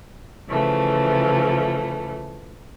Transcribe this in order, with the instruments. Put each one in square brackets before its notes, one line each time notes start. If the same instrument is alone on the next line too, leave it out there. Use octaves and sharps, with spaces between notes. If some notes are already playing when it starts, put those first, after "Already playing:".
[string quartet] C#3 E3 F3 A3